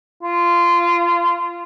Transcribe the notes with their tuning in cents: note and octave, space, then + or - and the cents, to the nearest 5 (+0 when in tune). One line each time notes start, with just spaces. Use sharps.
F4 -20